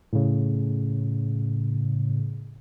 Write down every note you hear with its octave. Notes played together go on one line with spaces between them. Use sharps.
A2 C#3